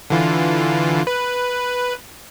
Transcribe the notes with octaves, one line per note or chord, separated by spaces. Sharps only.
D3 E3 F4
B4